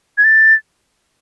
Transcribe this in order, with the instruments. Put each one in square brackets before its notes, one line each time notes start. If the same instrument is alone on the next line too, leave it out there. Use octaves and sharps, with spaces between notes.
[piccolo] G#6
A6